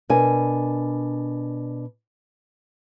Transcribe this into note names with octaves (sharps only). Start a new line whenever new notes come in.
B2 D4 A#4 G#5